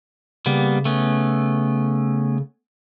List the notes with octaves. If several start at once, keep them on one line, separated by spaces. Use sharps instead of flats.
C#3 G3 A#3 B3
A3 B3 C#4